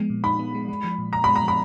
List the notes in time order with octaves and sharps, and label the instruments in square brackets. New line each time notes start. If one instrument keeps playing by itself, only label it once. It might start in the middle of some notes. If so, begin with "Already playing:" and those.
Already playing: [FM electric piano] F3 G#3 B3
A#2
[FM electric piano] D#4 [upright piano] B5
[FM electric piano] B3
G#3
G#3
F3
A#2
[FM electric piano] A#2 [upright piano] A#5
[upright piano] B5
[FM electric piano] G#3
[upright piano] A#5
[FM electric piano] F3
[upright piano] B5